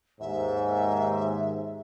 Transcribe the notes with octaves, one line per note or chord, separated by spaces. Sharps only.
D#2 G#2 E5